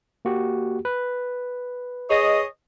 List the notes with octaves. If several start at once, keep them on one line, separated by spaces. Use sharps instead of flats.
A#3 F#4 G4
B4
G#4 C#5 D#5